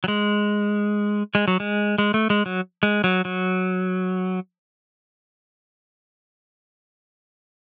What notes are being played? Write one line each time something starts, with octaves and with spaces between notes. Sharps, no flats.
F#3
G#3
G#3
F#3
G#3
G#3
A3
G#3
F#3
G#3
F#3
F#3